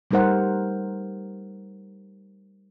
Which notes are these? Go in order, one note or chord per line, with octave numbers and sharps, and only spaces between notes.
G3 A3 D#4 A#4 C5 F#5